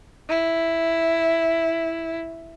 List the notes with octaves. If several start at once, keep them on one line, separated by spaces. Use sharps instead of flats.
E4